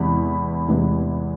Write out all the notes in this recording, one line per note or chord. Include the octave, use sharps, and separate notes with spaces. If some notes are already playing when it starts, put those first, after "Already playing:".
Already playing: E2 C3 E3 G#3 B5
E2 C3 E3 G#3